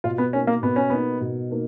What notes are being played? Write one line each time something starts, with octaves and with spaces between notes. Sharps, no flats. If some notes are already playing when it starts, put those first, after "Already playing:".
B2 F4
B3
A#3 C#4 D#4
A#3
B2 B3
C#4
A#3 B3 D#4
B2
A#3 D#4